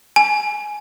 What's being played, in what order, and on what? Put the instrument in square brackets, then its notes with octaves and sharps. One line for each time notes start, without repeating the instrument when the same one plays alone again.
[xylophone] G#5